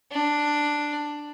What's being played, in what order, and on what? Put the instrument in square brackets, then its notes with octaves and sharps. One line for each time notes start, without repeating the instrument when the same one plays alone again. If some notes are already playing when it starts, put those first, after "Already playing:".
[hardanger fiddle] D4